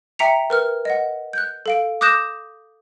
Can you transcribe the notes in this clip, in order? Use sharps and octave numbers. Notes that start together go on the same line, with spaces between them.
E5 G5 A#5 B6 C#7 F7
A#4 B4 F6
D#5 F#5
F#6 G6
A4 F5 D7
D6 D#6 F#6 G6 A#6 E7